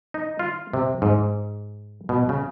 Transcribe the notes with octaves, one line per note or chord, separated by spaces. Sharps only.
D#4
F4
C3
G#2
B2
C#3